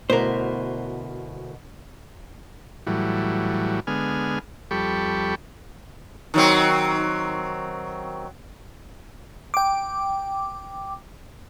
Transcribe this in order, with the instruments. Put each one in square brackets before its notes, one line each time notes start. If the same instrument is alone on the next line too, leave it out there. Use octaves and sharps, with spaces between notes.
[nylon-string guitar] D2 B2 E4 [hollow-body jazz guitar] A#4 C5
[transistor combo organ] A2 E3 F#3 G3
D3 G#3 B3 G#5 F6
F2 G3 G4 A4 B5 C#6
[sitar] D#3 F#3 C4
[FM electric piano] G5 D6